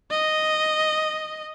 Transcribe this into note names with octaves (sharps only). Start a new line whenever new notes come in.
D#5